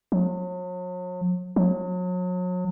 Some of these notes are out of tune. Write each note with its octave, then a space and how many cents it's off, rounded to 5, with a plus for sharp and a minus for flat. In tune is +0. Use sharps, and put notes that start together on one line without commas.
F#3 -40
F#3 -35